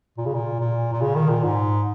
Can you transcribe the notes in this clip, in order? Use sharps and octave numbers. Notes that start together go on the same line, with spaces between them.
A#2
C#3
A#2
A#2
A#2
C#3
D#3
A#2
G#2